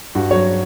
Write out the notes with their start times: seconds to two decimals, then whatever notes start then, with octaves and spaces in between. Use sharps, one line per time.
0.15 G2 F#4
0.31 F#3 C#5